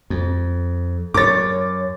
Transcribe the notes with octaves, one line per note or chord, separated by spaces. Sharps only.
F2
F#2 A#4 C#5 D6 A6